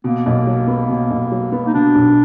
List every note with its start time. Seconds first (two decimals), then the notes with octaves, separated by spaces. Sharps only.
0.04 B2 A#3
0.26 B1
0.47 F#3
0.68 B3
0.89 B2
1.10 B1
1.32 F#3
1.52 B3
1.67 D#4
1.74 B2 D4
1.95 B1